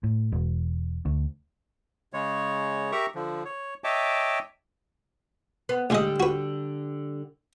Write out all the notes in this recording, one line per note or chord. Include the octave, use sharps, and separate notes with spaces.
A2
E1
D2
C#3 G#3 C#5
G4 A#4 E5 A#5 C#6
D3 F3
C#5
C#5 D#5 E5 G5 A5 D6
B3
A1 D3 G3 G#3 G4 D#5
F#4 B4